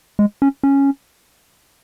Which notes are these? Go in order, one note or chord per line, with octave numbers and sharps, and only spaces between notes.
G#3
C#4
C#4